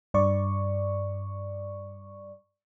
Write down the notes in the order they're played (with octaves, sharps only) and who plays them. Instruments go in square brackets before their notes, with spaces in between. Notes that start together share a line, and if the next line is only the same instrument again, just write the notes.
[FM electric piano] G2 D5 C#6